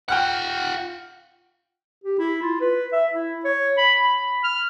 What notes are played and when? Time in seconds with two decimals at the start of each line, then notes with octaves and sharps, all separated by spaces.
0.09 F4 F#5 G5 F6 F#6
2.04 G4
2.19 E4
2.42 F4
2.61 B4
2.93 E5
3.14 E4
3.45 C#5
3.78 B5
4.04 B5
4.44 F6